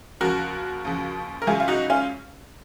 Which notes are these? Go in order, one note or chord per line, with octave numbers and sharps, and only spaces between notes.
D#2 C#3 F3 F#4 A#4
D#2 C#3 F3
A#4
C#2 C#3 F#3 F4 G#4
F4
D#4 F#4
C#4 F4